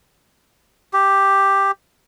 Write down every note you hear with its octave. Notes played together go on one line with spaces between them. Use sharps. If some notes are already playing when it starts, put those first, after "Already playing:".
G4